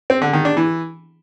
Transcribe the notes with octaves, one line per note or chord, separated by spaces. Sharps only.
C4
D3
D#3
D4
E3